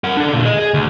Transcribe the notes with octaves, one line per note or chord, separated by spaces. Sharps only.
A#4 F#5
D4 A4
A#2 D3
G#4 D#5
G#4
D2